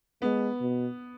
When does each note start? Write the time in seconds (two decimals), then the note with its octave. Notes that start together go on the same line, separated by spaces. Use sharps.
0.22 G#3 B3
0.61 B2